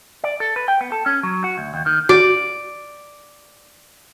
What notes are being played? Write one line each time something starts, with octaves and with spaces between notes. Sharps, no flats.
D5
A4
B4
G5
B3
A4
C#4
F#3
F#4
D2
D#2
D#3
F#4 D5